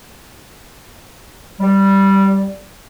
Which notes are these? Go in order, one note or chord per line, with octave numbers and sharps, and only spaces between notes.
G3